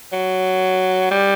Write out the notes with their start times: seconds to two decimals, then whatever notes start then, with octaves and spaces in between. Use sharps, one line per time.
0.13 F#3
1.11 G3